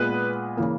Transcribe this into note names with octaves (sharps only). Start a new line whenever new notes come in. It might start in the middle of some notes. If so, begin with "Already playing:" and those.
Already playing: A#2 G#3 B3 B4
C#3 E3 A#3